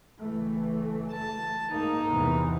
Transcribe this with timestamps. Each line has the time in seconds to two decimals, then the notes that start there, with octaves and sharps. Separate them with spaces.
0.20 F#1 E3 A3
1.11 A5
1.71 G#2 A#3 D#4
2.10 E2 C3 E3